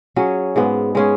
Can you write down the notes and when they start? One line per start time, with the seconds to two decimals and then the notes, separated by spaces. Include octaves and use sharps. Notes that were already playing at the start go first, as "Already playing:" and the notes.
0.16 F#3 C#4 G#4
0.56 G#2 G#3 B3
0.95 G#3 C#4 G#4